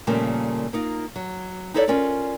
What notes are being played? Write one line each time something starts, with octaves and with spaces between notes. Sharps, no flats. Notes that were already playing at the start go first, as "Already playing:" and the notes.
A#2 C#3 F3 G3 A3 A#3
A#3 D#4 F4
F#3
D#4 E4 A4 C#5 D5
C#4 F4 A#4 D5